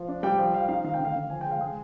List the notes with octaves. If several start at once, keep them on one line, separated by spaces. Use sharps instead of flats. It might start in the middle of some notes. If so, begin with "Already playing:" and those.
Already playing: F3
D4
G3 G5
F3 G5
F3 F5
D#4 F5
D#3 F5
G5
D3
F5
D3
F3 G#5
G5
G#3
F5
G#3 G#4